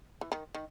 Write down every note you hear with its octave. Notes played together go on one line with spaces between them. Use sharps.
E3
D#3
D#3